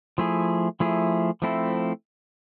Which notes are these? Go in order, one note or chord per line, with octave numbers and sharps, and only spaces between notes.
F3 A3 E4 G#4
F3 A3 E4 G#4
F3 A3 C4 E4 A4